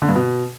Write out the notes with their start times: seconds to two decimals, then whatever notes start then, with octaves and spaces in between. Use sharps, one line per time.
0.02 D3
0.09 G2
0.16 B2